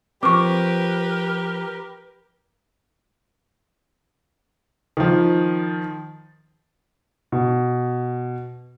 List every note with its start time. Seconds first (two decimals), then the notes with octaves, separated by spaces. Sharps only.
0.23 F3 C4 G4 A#4 B4 C#6 D6
4.97 D#3 F3
7.32 B2